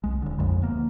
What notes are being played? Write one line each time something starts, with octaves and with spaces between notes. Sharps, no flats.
C2 G#3
D#1 D3
A#1 F2 G#3
D2 A#3 B3